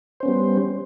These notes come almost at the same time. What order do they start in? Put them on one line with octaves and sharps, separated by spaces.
C5 C#4 B3 G3